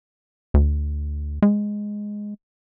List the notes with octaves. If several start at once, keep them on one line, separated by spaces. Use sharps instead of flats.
D2
G#3